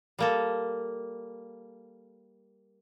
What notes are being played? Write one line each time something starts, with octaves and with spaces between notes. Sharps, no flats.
G3 A#3 A4